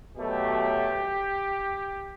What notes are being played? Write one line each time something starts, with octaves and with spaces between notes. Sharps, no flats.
B2 F#3 A3 G4